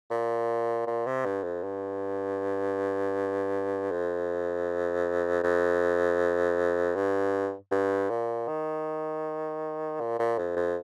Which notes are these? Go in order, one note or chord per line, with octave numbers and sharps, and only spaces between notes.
A#2
A#2
C3
G2
F2
G2
F2
F2
G2
G2
A#2
D#3
A#2
A#2
F2
F2